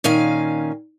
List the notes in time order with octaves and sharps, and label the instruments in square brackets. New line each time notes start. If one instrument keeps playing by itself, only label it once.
[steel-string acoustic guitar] A#2 D#3 C#4 F5 G#5